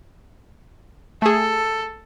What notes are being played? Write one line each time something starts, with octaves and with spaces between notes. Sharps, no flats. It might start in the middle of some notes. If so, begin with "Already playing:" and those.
A3 G#4 A4